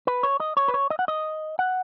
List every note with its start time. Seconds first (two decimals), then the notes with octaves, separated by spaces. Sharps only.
0.07 B4
0.23 C#5
0.40 D#5
0.57 C#5
0.68 B4
0.74 C#5
0.90 D#5
0.99 F#5
1.08 D#5
1.59 F#5